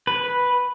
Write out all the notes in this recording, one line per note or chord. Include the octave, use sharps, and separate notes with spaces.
B4